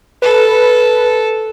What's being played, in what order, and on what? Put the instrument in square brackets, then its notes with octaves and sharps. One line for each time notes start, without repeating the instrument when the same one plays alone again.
[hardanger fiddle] A4 [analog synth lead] B4